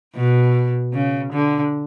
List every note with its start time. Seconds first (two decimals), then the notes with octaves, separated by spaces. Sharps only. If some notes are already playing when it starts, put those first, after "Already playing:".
0.15 B2
0.94 C#3
1.33 D3